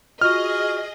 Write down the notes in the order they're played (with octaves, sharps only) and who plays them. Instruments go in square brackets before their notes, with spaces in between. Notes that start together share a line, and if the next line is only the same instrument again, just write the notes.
[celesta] F4 F#4 C#6 [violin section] G#4 D#5 [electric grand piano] F6